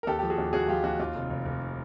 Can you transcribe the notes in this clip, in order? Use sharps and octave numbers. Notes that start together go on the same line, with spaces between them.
A#4
D#2 G4 A4
F3 G4 A4
F#4 G#4
D#2
D#2 F#4 G#4
F3 F4 G4
D#2 F#4
D#2 F4
F1
F1
F1